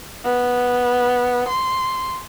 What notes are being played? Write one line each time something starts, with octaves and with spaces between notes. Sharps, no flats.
B3
C6